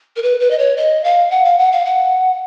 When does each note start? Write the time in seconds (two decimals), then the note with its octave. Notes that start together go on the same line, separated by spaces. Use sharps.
0.16 A#4
0.23 B4
0.40 B4
0.51 D#5
0.59 C#5
0.77 D#5
1.04 F5
1.31 F#5
1.45 F5
1.58 F#5
1.72 F5
1.85 F#5